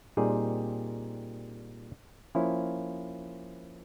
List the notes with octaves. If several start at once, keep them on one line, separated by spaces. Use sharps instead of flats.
A#2 G3 C4 D#4 G#4
F3 A#3 C#4 E4